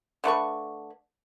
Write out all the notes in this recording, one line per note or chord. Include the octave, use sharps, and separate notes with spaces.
D3 A3 B4 C#6